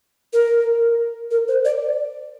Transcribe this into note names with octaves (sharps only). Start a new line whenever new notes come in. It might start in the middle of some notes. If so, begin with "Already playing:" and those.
A#4
A#4
C5
D5